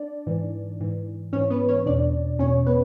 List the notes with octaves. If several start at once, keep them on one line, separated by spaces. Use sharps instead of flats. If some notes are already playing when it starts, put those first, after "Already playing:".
Already playing: D4 D5
G#2 E3
G#2 E3
G#2 E3 C#4 C#5
B3 B4
C#4 C#5
E2 B2 D4 D5
E2 B2 C#4 C#5
B3 B4